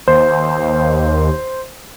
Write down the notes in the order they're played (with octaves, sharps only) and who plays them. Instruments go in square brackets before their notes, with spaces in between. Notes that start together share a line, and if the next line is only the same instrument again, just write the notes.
[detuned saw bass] D#2 [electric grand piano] C5